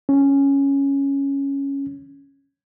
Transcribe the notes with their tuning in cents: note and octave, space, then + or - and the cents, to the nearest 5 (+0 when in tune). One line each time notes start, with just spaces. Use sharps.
C#4 +0